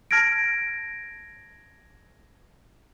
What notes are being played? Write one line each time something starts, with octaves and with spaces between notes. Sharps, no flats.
A5 F6 G#6 A#6 D7